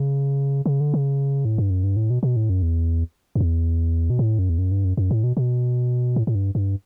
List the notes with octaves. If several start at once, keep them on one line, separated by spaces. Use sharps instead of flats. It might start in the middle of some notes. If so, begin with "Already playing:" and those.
Already playing: C#3
C#3
D3
C#3
A2
G2
F#2
G2
A2
B2
B2
A2
F#2
E2
F#2
E2
B2
A2
F#2
E2
F#2
G2
F#2
F#2
A2
B2
B2
A2
A2
G2
G2